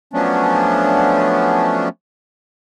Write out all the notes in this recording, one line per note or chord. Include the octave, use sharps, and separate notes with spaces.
F3 F#3 A3 B3 C#4 D4